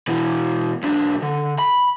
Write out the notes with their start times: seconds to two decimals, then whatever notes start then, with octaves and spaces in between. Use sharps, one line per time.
0.08 B2 E3
0.83 B1 D4
1.22 D3
1.59 B5